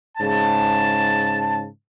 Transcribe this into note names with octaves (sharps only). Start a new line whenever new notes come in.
G#2 C#3 A5